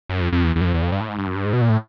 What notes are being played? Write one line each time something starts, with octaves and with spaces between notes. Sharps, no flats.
F#2
F2
F2
E2
E2
F#2
F2
E2
F2
G2
A2
G#2
G2
F#2
G2
G#2
B2
A#2
A2